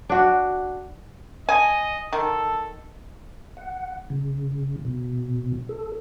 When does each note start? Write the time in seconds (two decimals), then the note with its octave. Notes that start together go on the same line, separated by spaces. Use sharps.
0.09 D4 F#4
1.49 D#5 G#5
2.13 D#3 A4
3.57 F#5
4.10 C#3
4.85 B2
5.69 A4